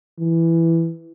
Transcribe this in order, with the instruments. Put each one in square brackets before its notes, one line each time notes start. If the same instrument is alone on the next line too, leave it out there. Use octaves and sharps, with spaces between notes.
[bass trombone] E3